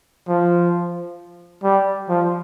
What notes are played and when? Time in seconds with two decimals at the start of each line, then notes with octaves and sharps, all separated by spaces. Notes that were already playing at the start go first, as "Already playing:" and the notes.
0.28 F3
1.64 G3
2.09 F3